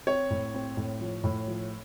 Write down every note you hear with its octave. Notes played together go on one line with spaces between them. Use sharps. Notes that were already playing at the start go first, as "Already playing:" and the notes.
C4 C#5
A2
C4
A2
F3
A2
F3